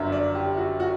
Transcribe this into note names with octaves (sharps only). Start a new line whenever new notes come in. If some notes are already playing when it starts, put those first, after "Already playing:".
Already playing: G1 F#2 D3 E5
D5
G4
F#4
F#4